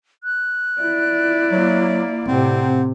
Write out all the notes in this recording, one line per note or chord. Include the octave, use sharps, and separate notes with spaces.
F#6
E4 D5
F#3 A#3
A2 C3 C4 F#5